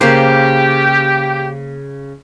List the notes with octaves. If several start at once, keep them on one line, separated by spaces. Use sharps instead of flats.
C#3 A#3 G4 C5